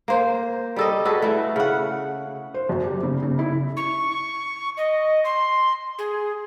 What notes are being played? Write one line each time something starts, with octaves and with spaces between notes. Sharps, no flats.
A#3 C5
G3 A4 D#5
F#4 G#4 A4 B4
A3 E4
C#3 F#5
C5
F#2
G4
C#3
C#3
E4
C#6
D#5
C6
G#4